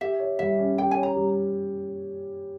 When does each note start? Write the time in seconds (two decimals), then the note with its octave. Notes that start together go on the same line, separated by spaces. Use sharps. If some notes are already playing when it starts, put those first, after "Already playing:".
0.01 G4 E5
0.20 C#5
0.39 G3 E5
0.59 C#4
0.78 G4 G5
0.91 G#5
0.97 C#5
1.03 A#5
1.16 G3